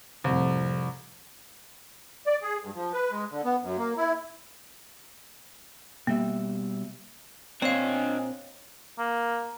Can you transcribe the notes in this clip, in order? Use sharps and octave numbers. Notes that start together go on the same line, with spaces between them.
C2 F2 A2
D5
G#4
G2
F3
B4
G#3
D3
B3
F#2
A#3
E4
B2 G3 A#3 E5
A#2 C4 D4 C#5 D#5 F5 G#5
A#3